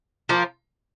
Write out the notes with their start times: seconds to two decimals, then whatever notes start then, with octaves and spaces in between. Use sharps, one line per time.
0.29 F3 A#3